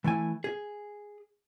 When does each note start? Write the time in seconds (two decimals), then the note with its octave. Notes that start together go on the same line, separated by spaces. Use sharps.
0.04 E3 A3 E4 G#5
0.44 G#4